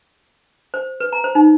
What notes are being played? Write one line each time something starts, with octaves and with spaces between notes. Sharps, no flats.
C5
B4
A#5
C5
D#4